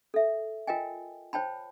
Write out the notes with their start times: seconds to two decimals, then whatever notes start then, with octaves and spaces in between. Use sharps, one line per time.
0.14 A4 E5
0.67 F4 A#4 D#5 G5 G#5
1.33 C5 C#5 G5 A5 B5